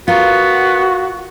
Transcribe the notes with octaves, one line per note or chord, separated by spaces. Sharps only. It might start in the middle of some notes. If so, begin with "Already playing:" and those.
B3 F4 F#4 A#4